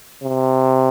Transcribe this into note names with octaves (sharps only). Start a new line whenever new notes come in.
C3